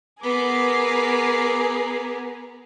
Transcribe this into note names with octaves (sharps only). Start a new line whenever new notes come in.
B3 G#4 A#4 D6 C7